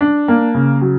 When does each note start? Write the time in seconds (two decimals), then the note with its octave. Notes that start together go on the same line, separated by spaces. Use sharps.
0.01 D4
0.28 A#3
0.54 C#3
0.81 F#3